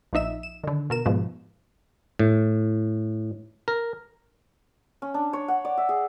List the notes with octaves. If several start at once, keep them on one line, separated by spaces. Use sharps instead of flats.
A#1 F3 D#4 E5 E7
E7
D3 D#3
B2 A#4 E7
G#2 B2 F3
A2
A#4
C#4
D4
C#5
F#5
D5
E5
G#4